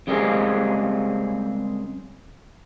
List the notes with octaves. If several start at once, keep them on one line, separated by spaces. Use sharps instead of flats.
C#3 G3 G#3 A#3 C4 G#4